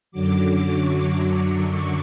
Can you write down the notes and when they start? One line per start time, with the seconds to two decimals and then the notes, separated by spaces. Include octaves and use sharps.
0.11 F#2 D3 F#3 D6
0.69 C#6
1.26 D6